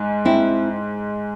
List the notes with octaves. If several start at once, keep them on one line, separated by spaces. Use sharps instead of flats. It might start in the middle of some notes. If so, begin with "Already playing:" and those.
Already playing: G#2 G#3
C4 E4